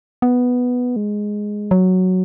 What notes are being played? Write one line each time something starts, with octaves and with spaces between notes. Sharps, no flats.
B3
G#3
F#3